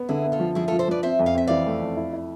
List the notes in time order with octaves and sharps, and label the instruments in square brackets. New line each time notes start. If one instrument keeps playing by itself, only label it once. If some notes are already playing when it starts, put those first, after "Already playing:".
Already playing: [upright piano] B3
[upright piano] D3 [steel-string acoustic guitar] E4 G#4
[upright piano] B3
[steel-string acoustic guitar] F4 A4
[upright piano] F3
[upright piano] F3 [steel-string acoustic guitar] E4 G#4
[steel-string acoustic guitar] F4 A4
[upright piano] F3
[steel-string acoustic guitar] A4 C5
[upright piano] F3 [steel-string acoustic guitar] B4 D5
[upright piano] C4 [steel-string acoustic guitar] C5 E5
[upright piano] F2
[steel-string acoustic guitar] F5
[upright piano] C4 [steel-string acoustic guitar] E5
[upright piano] E3 [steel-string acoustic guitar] D5 F5
[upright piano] A3
F2
E4
E4